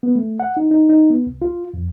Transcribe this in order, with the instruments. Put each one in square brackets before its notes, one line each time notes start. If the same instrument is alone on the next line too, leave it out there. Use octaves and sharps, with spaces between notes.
[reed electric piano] B3
A3
F#5
D#4
D#4
D#4
B3
C2
F4
F2